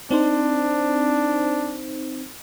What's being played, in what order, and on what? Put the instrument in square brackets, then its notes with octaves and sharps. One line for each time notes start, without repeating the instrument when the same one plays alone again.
[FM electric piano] C4 D#4 C5 [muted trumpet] D4